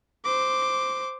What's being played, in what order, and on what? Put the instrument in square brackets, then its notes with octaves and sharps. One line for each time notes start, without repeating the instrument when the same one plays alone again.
[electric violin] C5 D6